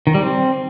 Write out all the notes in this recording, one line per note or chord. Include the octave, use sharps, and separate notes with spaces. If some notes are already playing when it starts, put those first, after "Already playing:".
D#3
G3
C4